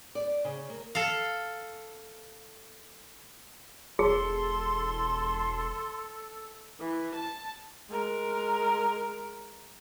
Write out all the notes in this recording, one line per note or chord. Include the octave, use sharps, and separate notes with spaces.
D5
C#3
A#3
A4 F5
E1 G#4 A4 C6
E3
A5
G#3 A#4